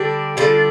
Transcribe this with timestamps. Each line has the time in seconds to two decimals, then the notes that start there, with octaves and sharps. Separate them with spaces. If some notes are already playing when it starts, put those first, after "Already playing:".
Already playing: D3 G3 D4
0.37 D3 G3 D4 F4